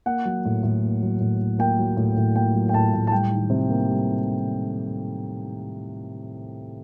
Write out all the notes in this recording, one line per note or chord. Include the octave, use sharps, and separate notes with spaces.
A#3 F#5
F#3
A2
A2
A#3
F#3
A2
A2
A#3 G5
F#3
A2
A2
A#3 G5
F#3
G5
A2 A5
A2
A5
G3 G5
D#3
C3
A#3
G3